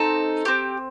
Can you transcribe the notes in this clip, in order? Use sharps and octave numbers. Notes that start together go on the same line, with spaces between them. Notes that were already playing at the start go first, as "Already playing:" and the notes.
Already playing: C4 D#4 A4
C4 G4